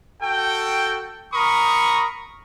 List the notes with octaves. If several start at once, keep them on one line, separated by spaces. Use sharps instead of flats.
F#4 A4 G5
A#4 A#5 B5 C#6 D#6